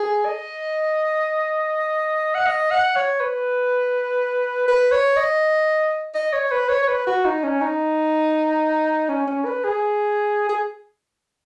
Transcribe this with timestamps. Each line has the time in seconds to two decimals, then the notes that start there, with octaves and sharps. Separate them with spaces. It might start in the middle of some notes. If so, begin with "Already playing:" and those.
Already playing: G#4
0.26 D#5
2.35 F#5
2.47 D#5
2.71 F#5
2.96 C#5
3.21 B4
4.68 B4
4.92 C#5
5.16 D#5
6.15 D#5
6.33 C#5
6.52 B4
6.69 C#5
6.83 C#5
6.88 B4
7.07 F#4
7.25 D#4
7.44 C#4
7.61 D#4
9.09 C#4
9.28 C#4
9.46 B4
9.64 G#4
10.49 G#4